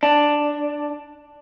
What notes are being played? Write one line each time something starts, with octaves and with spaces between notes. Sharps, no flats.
D4